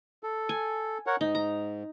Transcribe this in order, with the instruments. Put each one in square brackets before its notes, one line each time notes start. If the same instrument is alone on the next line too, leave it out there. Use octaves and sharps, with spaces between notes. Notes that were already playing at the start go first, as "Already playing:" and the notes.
[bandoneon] A4
[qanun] G#5
[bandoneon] A#4 C#5 F#5
[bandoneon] G#2 [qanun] D#4
[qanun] A#5